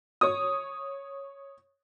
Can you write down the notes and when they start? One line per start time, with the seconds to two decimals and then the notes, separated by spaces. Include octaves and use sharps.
0.21 C#5 D#6